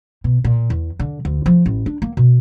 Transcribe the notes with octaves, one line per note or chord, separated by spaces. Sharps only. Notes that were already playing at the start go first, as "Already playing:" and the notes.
B2
A#2
E2
D3
D2
F3
A1
D4
A#3
B2